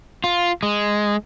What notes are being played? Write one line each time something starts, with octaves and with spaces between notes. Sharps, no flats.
F4
G#3